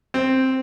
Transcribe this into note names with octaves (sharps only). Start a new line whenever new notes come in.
C4